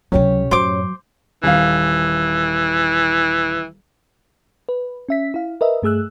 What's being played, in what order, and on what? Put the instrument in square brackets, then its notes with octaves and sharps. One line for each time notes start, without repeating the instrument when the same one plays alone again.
[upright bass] C#2 C3 [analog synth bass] F#3 [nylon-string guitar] C#4 G4 C#5
[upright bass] F#2 A2 [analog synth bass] F#3 [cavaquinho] C5 D6
[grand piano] D#1 F5 [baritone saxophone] E3
[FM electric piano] B4
C#4 E5 B6
E4 F5
A#4 B4 D#5 E5
G2 A3 G#4 E6 F#6